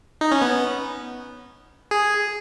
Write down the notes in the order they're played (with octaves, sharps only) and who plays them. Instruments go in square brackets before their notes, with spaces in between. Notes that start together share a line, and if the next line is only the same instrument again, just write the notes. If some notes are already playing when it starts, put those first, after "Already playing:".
[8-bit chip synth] D#4
C#4
B3
G#4